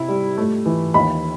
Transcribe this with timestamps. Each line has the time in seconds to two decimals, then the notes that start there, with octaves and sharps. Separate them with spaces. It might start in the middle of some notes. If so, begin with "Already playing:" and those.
Already playing: C3 E4
0.08 G3
0.38 A3
0.66 E3
0.94 D#2 B5